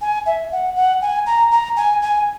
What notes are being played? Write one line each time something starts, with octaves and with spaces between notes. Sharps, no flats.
G#5
E5
F#5
F#5
G#5
A#5
A#5
G#5
G#5